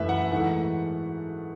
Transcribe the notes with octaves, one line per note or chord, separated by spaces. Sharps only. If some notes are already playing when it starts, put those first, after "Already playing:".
Already playing: F#2 E3 A3 B4 E5
F#5
G#2 E3 A3 F#5